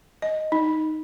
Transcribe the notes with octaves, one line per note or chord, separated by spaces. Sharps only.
D#5
D#4